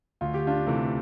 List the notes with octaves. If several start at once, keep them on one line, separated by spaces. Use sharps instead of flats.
D2 F4
G4
D4 F4
C3 E3 A3